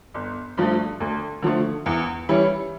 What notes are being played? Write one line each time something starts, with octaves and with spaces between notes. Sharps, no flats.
G1
G2 F3 A3
D2
D3 F3 A3
E2
E3 G3 C#4 E4